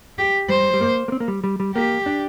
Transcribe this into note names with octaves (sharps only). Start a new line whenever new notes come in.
G4
G3 C5
G3
A#3
A#3
C4
A#3
G3
G3
G3
A#3 G4
D4